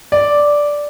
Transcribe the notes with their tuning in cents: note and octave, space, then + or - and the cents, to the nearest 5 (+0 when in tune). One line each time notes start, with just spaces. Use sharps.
D5 -5